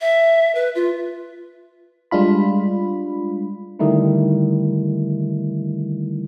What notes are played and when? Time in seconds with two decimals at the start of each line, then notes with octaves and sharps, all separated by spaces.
0.01 E5
0.55 B4
0.75 F4
2.11 G3 G#3 D4 F4 B5
3.79 D3 D#3 G3 A3 D#4 E4